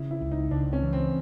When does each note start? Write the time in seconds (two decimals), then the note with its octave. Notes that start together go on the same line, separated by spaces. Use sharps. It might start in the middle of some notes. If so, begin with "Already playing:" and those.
Already playing: C#3 E4
0.11 E4
0.21 C#2
0.32 D#4
0.51 C#2 D4
0.73 C#4
0.82 E3
0.93 C4